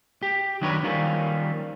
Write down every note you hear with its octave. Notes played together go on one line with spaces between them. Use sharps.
G4
D#3 F#3 D4 F#4 B4 C#5
D#3 F3 G3 A#3 C#4